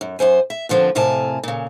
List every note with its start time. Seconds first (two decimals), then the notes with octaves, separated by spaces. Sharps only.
0.01 F#2
0.19 F#2 E3 C5 G#5
0.50 E5
0.69 G2 D3 F3 A#3 C4
0.95 F2 A2 C3 A#4 G#5 A5
1.43 A#2 C#3